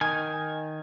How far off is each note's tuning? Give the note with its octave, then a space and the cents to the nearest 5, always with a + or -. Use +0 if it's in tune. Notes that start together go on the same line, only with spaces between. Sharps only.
D#3 +0 G#5 +0